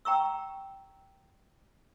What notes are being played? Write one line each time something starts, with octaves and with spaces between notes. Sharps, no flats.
G5 A#5 C#6 E6